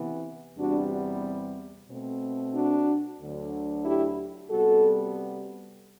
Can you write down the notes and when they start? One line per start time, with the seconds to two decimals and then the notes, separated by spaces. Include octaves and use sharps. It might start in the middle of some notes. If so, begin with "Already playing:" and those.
Already playing: C3 E3 B3
0.58 E2 C3 G3 B3 D4 F#4
1.89 B2 A3 C4
2.54 D4 F#4
3.20 D2 D3 F#3
3.85 E4 G4
4.50 C3 G3 B3 F#4 A4